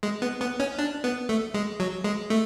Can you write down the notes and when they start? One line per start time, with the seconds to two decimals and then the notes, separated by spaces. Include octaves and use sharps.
0.03 G#3
0.22 B3
0.41 B3
0.60 C#4
0.79 D4
1.04 B3
1.29 A3
1.54 G#3
1.80 F#3
2.04 G#3
2.30 A3